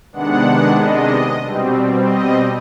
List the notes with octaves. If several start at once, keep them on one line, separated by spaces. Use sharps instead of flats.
C3 D#3 G#3 B3 D4 F#5
D#5
B2 G3 C4
D#5